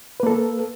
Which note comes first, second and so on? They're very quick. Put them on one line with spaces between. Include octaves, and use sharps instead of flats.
B4 A#3 A4